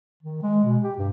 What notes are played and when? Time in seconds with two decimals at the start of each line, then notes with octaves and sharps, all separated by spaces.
0.22 D#3
0.42 G#3
0.64 B2
0.83 G4
0.98 G2